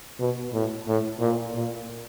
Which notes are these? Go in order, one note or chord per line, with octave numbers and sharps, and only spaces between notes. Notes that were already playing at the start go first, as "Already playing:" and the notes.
B2
A2
A2
A#2
A#2